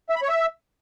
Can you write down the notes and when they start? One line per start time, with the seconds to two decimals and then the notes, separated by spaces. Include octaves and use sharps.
0.09 E5
0.16 B5
0.22 C#5
0.29 E5